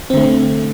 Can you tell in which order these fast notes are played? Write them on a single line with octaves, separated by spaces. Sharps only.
C4 D3 A3